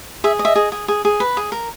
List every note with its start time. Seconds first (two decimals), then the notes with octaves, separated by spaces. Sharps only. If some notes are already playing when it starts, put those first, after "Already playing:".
0.24 G#4 E5
0.39 D#5
0.45 E5
0.56 G#4
0.72 G#4
0.88 G#4
1.05 G#4
1.20 B4
1.37 G#4
1.52 A#4